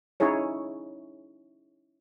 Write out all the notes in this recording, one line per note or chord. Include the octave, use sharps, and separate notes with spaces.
C#4 D#4 E4 G#4 C#5